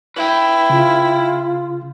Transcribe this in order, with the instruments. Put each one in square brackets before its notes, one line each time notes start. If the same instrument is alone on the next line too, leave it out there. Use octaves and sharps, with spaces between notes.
[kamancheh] E4 [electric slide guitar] B4 G5
[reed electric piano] C#3 [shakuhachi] F4